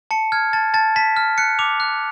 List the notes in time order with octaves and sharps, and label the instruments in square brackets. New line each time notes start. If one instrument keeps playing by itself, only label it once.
[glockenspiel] A5 C#7
F6 G#6
A5 A6
A5 A6
A5 B6
F6
F#6 C#7
D6 F7
F#6